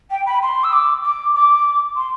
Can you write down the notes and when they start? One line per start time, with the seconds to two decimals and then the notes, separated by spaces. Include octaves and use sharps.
0.10 G5
0.26 B5
0.42 C6
0.63 E6
0.72 D6
1.03 D6
1.34 D6
1.96 C6